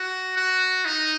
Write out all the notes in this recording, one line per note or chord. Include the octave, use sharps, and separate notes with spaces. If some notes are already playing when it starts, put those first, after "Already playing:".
Already playing: F#4
F#4
D#4